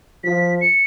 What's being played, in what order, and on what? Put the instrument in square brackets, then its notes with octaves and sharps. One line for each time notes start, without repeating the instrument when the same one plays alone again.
[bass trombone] F3 [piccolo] B6
[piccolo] C#7